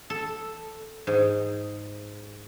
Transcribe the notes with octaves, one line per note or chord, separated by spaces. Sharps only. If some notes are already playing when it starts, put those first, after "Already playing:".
A4
G#2